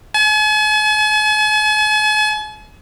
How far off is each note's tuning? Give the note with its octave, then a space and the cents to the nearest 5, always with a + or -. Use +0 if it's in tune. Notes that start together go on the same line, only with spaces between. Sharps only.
G#5 +45